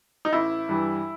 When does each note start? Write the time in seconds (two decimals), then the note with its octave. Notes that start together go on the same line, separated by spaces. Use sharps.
0.25 D#4
0.33 A1 E4
0.69 G2 E3 G3